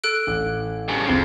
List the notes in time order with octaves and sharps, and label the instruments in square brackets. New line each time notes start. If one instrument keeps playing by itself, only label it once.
[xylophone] A4 F#6 D7
[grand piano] A1
[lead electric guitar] G2 C#3
[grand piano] F#1 C4 C7 [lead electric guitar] F2